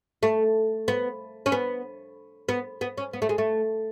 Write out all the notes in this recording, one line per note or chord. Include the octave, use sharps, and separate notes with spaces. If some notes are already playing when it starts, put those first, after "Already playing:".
A3
B3
C#4
B3
B3
B3
C#4
B3
A3
G#3
A3